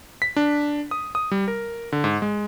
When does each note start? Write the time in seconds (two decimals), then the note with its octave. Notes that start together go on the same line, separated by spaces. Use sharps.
0.22 B6
0.36 D4
0.91 D#6
1.15 D#6
1.31 G3
1.48 A#4
1.92 D3
2.04 G#2
2.22 G#3